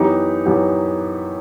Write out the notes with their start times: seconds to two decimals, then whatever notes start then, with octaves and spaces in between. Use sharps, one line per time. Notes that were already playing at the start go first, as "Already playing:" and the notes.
Already playing: F#2 E3 B3 D#4 G4
0.46 F#2 E3 B3 D#4 G4